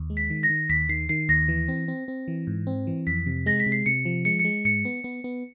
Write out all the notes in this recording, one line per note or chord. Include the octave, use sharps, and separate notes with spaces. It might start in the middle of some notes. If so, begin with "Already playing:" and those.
Already playing: D#2
G#3
B6
D#3
A#6
D#3
D#2 B6
D#3 C7
D#3 C7
D#2 A#6
E3
C4
C4
C4
E3
G#2
C4
E3
F2 B6
C3
G#3 A#6
B6
C3
C7
C3 C#7
F3
G#3 C#7
C#7
G#3
G#2 C#7
B3
B3
B3